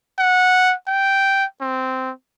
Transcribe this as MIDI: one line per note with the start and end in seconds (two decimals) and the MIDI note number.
0.19 0.74 78
0.88 1.45 79
1.61 2.11 60